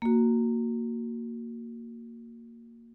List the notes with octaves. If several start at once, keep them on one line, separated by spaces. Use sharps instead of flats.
A#3 F#4